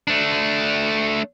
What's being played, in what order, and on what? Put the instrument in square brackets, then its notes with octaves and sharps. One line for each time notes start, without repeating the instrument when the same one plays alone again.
[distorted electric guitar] A3 D4